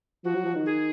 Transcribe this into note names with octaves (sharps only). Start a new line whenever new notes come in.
F3 F#4
F#3
F3
D#3
G#4